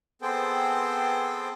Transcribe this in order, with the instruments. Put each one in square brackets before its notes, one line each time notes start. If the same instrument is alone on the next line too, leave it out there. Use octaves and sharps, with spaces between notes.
[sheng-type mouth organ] B3 C4 G#4 A4 C5 G5